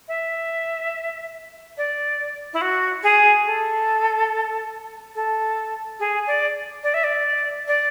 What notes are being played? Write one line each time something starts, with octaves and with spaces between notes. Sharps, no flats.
E5
D5
E4
F#4
G#4
A4
A4
G#4
D5
D5
E5
D5
D5